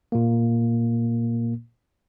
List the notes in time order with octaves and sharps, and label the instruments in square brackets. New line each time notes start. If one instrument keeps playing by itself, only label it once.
[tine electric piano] A#2 A#3